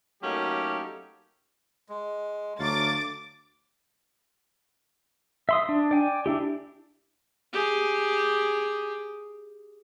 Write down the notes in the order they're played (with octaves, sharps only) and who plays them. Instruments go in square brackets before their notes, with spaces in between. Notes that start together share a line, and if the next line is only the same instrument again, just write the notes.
[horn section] F#3 A3 A#3 C#4 D#4 G4
[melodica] G#3
[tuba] D2 [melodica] F#3 A3 F5 [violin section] D6 A6
[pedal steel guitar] E5 C6 D#6
D4
D5 G5 G#5
D4 E4 G4
[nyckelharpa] G4 G#4